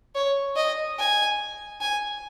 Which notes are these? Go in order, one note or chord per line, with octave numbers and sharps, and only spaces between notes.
C#5
D#5
G#5
G#5